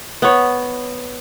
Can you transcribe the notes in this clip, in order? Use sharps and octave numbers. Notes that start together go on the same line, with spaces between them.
B3 C#5